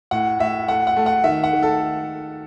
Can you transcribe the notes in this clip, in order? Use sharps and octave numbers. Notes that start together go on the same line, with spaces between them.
A2 F#5
A2 E5
A3 F#5
F#5
A3
F#5
D#3 E5
F#5
D#3
A4